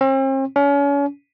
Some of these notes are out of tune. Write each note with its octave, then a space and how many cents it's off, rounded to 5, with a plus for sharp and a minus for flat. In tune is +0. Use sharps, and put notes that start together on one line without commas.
C4 +45
C#4 +35